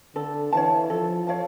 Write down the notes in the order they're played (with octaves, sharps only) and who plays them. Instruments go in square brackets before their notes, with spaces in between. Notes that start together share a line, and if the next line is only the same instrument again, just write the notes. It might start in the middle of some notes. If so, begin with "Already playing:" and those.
[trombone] D3 [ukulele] A4
[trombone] E3 [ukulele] C#5 F5 A5
[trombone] F3 [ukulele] A4
[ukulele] C#5 F5 A5